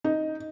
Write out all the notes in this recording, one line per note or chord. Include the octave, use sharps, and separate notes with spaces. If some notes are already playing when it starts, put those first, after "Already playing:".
D#4